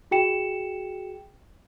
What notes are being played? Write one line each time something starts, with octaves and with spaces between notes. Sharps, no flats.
F#4 G#4 G5 C#7 E7